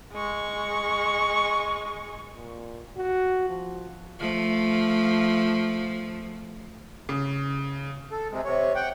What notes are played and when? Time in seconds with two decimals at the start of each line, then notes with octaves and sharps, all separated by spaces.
0.13 G#3 C#6
2.36 A#2
2.97 F#4
3.49 F3
4.19 F3 A3
7.09 C#3
8.11 A4
8.31 C3 G#3
8.45 C3 C#5
8.75 F#5 G5